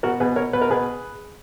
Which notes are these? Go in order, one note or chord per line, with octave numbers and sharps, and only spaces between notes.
B2 F#4 A#4
B2 G#4 B4
B2 A#4 C#5
B2 B4
A#4
B2 G#4 B4